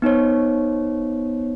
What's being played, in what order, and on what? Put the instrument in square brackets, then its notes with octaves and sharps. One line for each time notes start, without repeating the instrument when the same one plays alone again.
[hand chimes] B3 D#4 C5 C#5